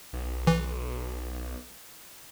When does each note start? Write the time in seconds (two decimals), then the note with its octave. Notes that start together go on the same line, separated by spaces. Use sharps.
0.13 B1
0.47 E3